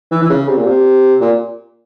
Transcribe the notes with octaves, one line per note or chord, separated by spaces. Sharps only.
E3
E3
C#3
C3
A#2
C3
A#2